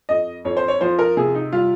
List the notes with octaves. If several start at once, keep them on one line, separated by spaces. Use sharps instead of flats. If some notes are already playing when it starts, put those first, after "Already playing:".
F2 D#5
F2 C#5
C5
C#5
F3 C5
A#4
C3 G#4
D#4
G3 F4